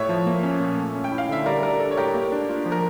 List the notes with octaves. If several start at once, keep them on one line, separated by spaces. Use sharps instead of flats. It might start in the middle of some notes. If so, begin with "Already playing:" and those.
Already playing: A2 C#5 E5
F3
A#3
C#4
A#2
A3
C#4
G5
E4
F5
D3 E5
G3 A#4 D5
D4 A#4 D5
A4
C#5
A2 G4 A#4
A#3
D4
F4
F3
A#4